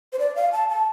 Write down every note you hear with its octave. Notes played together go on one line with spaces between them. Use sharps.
C5
D5
F5
A5
A5